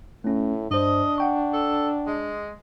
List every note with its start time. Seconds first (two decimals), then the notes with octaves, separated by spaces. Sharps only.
0.24 A2 A3 C#4
0.71 G2 D4 C5 D#5
1.18 F#5 G5 C#6
1.53 A4
2.07 G#3